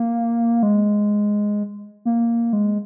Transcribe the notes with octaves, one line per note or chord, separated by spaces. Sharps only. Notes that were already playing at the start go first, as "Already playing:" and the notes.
Already playing: A#3
G#3
A#3
G#3